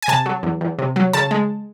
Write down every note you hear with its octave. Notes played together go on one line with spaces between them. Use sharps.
G#5
C3 A5
F#3
E2
E2
C3
F#3
C#3 A5
G#3